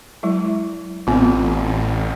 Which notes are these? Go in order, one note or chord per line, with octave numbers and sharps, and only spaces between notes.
F#3 G#3 E4
A1 B3 C4 F4